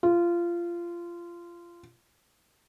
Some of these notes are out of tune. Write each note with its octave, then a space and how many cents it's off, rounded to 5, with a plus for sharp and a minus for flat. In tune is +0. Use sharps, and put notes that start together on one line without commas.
F4 -20